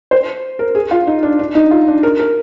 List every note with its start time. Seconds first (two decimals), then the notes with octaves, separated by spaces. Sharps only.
0.11 C5
0.59 A#4
0.75 G#4
0.91 F4
1.07 D#4
1.23 D4
1.39 D4
1.55 D#4
1.71 F4
1.87 D4
2.03 A#4
2.19 A#4